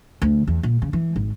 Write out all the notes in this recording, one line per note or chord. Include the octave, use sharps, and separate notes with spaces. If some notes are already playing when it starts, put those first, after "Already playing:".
D2
E2
A#2
C#3
E3
G#1